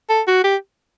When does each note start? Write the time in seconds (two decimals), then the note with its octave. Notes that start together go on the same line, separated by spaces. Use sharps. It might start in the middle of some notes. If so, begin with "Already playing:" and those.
0.09 A4
0.28 F#4
0.44 G4